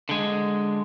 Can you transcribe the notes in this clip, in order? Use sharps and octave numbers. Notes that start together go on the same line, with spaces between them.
D3 G#3